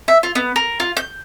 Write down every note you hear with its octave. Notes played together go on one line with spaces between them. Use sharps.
E5
F4
B3
A#4
F4
G6